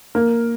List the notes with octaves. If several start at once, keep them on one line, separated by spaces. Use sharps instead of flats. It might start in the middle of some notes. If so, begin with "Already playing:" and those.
A#3